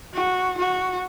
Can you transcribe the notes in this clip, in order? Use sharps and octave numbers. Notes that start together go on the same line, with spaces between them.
F#4
F#4